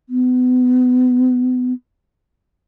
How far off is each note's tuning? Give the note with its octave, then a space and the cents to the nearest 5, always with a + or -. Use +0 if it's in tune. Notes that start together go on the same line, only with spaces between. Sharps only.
B3 +30